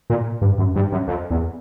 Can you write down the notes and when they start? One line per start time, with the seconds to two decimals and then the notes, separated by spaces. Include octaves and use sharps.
0.10 A#2
0.42 G2
0.58 F#2
0.76 G2
0.92 F#2
1.08 F2
1.31 E2